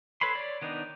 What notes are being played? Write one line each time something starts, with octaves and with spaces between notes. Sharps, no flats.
A4 B4 C#5 B5 C6
C#5 D5
D#3 B3 D4 D#4